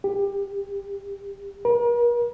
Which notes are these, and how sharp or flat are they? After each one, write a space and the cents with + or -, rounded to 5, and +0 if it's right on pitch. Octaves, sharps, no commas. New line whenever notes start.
G4 +20
A#4 +45